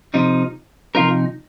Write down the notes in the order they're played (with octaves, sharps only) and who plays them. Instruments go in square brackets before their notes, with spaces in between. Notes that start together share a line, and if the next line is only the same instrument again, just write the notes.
[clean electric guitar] C3 F3 D#4
C3 F3 D#4 F4 A#4